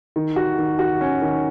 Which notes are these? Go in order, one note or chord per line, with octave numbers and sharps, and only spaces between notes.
D#3
F#4
D#3
F#4
C#4
D#3